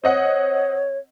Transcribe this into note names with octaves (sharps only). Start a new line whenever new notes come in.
C4 C#5 D#5 F#5